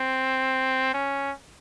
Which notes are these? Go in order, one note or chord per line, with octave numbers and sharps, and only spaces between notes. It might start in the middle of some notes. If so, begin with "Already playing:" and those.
Already playing: C4
C#4